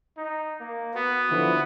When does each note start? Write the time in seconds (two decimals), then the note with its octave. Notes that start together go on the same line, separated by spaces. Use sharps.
0.17 D#4
0.60 A#3
0.95 B3 F#4
1.30 D3 E3 F3